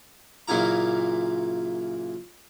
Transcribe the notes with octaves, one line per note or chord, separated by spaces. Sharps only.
F#2 A#2 C#3 E3 E4 A#5